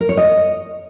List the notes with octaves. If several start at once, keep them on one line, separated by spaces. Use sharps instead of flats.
A#4
C#5
D#5